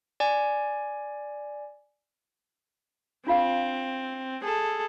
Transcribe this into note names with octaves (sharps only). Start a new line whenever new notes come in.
D5 G#5
C4 D4 F4 F5
G#4 A4